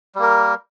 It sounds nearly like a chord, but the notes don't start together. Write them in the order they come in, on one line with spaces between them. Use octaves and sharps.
G3 A#3 A#4